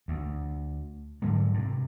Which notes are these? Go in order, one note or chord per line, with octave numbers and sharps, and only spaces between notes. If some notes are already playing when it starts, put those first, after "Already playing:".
D2
G#2 D3 F#3 G#3
G2 C3